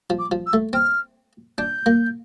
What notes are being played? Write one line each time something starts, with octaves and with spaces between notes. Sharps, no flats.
F3
D6
F3
E6
A3
C4 F6
D4 G6
A#3